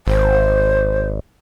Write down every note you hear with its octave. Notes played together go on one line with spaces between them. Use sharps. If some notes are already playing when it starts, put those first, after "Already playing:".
G#1 C5